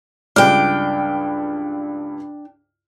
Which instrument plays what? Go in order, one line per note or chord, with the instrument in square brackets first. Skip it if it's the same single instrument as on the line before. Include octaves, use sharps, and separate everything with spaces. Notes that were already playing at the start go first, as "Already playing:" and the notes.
[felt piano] C#2 G2 F6 [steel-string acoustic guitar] D4 G5